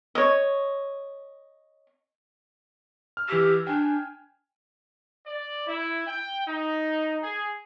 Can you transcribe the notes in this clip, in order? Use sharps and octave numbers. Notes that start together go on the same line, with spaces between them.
C#5 D#5
F6
E3 G4 E6
D4 G5 G#5
D5
E4
G5
D#4
G#4